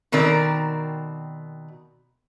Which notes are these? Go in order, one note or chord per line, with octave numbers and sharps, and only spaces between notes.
B2 D#3 C4 A#4 D5